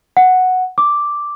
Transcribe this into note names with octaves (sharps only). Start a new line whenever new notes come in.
F#5
D6